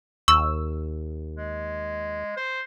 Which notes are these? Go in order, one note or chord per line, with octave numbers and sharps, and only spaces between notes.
D#2 C#6 E6
G#3
C5